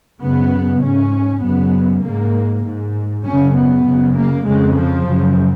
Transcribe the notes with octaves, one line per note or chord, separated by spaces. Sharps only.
F#2 C#3 B3
G#2 C#4
F#2 C#3 B3
G#2 A#3
G#2
F#2 C#3 C#4
B3
F#2 C#3
A#3
F2 C#3 G#3
F3
F#2 C#3